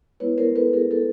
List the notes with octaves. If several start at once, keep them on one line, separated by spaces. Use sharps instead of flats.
G#3 B3 E4 B4 C#5
A#4 C5
A4 B4
G#4 A#4
A4 B4